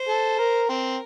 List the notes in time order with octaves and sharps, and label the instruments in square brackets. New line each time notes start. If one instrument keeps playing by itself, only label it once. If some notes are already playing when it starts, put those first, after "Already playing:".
Already playing: [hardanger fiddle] C5
[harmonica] A4
A#4
[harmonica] C4 [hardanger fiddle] A#4